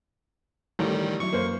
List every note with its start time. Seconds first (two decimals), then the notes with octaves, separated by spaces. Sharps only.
0.79 A1 D#3 G3
1.02 F3
1.20 F#3 D#4 E4 C#6
1.33 F#2 A#3 C5